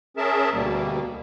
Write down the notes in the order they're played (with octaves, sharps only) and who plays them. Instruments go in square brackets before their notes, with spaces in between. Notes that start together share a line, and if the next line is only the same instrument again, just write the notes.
[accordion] C#4 G#4 A#4 E5 A5
D2 B2 G3 A#3